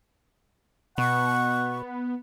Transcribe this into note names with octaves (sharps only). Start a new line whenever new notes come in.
B2 B3 F#5 C#6